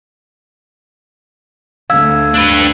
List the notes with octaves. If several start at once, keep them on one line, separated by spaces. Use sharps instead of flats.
D2 F5 E6 G#6
D4 B4